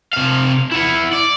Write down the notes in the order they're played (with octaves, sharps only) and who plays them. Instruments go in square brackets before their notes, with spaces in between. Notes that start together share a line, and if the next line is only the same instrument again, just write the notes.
[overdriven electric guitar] C3 F5
E4 F#5
D5